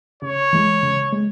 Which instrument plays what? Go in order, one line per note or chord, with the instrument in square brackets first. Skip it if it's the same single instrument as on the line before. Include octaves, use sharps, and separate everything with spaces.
[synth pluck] C#3 [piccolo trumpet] C#5
[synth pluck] E3 G#3
C#3
G#3